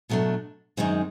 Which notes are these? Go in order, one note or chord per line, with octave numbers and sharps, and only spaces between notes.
B2 F#3 A3 D4
F#2 D#3 G#3 C4 D#4